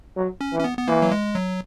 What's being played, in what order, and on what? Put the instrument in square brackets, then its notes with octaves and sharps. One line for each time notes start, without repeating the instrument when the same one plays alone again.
[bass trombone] F#3
[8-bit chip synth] C#4
[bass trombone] E3
[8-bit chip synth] C#4
B3
B3
[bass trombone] E3 [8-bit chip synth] A#3
[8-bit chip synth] F#3
G#3
F#3